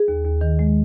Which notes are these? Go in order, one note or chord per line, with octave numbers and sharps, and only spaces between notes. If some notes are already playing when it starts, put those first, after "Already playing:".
Already playing: G#4
D#2
D#2
D#3
G#3